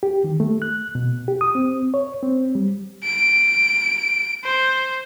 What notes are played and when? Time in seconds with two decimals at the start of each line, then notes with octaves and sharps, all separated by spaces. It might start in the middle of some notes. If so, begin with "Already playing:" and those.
0.03 G4
0.24 D#3
0.40 A3
0.62 F#6
0.95 B2
1.28 G4
1.41 D#6
1.55 C4
1.94 C#5
2.23 C4
2.55 G3
3.04 D7
4.44 C5